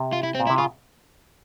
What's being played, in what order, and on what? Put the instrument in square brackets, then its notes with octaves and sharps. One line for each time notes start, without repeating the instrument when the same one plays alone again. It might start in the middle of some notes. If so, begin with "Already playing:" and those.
Already playing: [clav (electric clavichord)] C3
[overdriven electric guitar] F4
E4
C4
[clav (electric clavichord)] A#2
[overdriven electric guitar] E4
[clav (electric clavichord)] C3
[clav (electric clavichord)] C#3 [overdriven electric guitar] F4